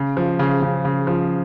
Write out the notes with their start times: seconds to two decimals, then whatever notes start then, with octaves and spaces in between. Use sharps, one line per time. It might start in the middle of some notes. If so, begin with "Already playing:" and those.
Already playing: C#3
0.17 F3
0.39 C#3
0.62 C#3
0.85 C#3
1.07 F3